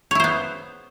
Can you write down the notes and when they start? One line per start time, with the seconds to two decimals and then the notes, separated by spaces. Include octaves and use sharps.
0.11 C#5
0.15 E4
0.20 C5
0.24 B3